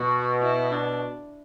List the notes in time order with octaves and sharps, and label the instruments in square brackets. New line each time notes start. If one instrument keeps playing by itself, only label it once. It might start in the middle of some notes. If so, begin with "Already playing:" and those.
Already playing: [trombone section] B2 [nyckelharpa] F#4
[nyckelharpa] E4
D4